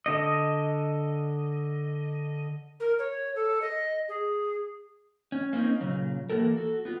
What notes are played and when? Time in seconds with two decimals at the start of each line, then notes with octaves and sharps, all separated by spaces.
0.06 D3 D#5
2.80 A#4
2.99 C#5
3.35 A4
3.61 D#5
4.08 G#4
5.32 C#4
5.53 A#3 C4 C#4 D#4
5.81 A#2 C#3 F#3
6.30 E3 A#3 B3 F#4 A4 A#4
6.57 F#4 A4
6.85 B3 F4